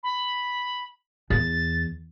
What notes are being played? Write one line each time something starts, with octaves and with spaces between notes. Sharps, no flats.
B5
E2 A6